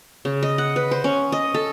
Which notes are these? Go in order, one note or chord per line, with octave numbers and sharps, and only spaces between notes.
C#3
D#5
F#5
B4
C5
C#4
D#5
A4